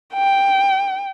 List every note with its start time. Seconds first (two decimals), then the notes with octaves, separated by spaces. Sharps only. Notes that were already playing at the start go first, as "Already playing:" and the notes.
0.14 G5